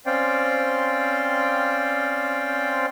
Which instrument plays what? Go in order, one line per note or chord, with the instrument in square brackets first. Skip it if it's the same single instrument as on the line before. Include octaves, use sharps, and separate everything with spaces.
[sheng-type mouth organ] C4 C#4 C5 D5 F5 G5